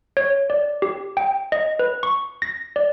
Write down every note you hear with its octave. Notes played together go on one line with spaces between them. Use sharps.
C#5
D5
G4
G5
D#5
B4
C#6
A#6
D5